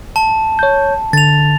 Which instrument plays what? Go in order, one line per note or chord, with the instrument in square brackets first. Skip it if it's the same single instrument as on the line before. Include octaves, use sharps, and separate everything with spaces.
[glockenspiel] A5
[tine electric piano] C#5 G6
[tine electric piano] D3 [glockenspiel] A6 F7